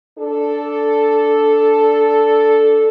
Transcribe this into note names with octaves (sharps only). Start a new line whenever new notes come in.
D4 A4